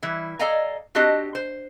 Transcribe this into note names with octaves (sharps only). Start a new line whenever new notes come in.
E3 G3 E4
A4 D5 D#5 F5 G#5 A#5
C4 D4 F#4 G4 D#5 A5
C5